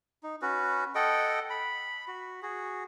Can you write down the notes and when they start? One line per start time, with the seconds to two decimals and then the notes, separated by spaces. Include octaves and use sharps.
0.23 D#4
0.42 C#4 F#4 B4
0.95 A4 D#5 F#5 G5
1.50 B5
2.08 F#4
2.42 F#4 G#4